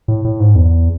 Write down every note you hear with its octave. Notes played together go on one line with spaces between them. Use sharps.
A2
A2
G#2
E2